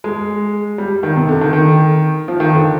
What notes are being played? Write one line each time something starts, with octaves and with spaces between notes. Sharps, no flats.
G#3
G3
D#3
C3
D3
D#3
D#3
F3
D#3
D3